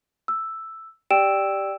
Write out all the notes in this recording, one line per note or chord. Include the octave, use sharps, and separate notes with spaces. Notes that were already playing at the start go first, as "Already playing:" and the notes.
E6
G4 D5 G5 E6 D7 E7